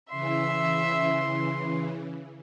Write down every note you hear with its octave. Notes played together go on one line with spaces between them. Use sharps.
C#3 E3 E5 C6